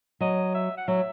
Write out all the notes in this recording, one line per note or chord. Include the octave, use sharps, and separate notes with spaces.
F#3 D#5
E5
F#5
F#3 E5